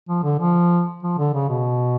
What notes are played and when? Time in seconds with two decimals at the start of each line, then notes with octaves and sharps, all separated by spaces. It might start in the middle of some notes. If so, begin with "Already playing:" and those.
0.09 F3
0.23 D3
0.39 F3
1.03 F3
1.18 D3
1.34 C#3
1.49 B2